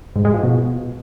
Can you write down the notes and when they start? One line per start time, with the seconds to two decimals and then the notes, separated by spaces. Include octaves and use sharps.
0.16 G#2
0.25 G#3
0.34 F3
0.43 B2